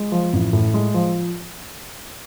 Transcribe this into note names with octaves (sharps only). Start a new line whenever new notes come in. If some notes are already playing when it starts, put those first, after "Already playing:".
Already playing: G#3
F3
A1
A2
G#3
F3